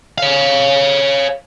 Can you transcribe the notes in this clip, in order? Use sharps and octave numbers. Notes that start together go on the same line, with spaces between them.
C#5 F5